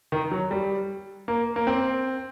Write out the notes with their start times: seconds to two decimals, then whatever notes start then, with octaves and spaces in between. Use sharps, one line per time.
0.12 D#3
0.31 F#3
0.51 G3
1.28 A#3
1.56 A#3
1.67 C4